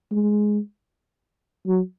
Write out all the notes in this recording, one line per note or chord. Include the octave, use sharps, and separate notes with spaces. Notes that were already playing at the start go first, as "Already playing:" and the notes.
G#3
F#3